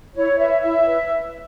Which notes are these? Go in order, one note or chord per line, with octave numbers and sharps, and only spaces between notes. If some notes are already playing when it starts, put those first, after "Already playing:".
E4 C#5
B4 E5
E4 E5
B4